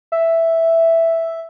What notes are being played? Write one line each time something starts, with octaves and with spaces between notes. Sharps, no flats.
E5